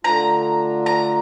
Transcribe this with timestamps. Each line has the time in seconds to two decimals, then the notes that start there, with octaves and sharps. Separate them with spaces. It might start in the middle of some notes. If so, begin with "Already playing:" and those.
0.04 D3 A3 D4 F4 A#5
0.86 A#5